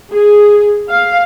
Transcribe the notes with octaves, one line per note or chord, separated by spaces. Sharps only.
G#4
F5